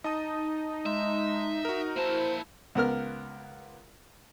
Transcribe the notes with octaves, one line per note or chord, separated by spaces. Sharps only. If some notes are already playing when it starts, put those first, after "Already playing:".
D#4 D#5 A5 D#6
G#3 E5
F#4 A#4
A#3 E4 C5 A5
C#2 B3 A#4 F6